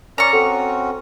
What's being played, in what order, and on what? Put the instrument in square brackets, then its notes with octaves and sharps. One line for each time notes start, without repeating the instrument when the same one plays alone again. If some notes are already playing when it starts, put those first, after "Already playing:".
[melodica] C#4 A#4 D5 [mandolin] A#5 C#6
[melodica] C4 C#4 F#4 [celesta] A4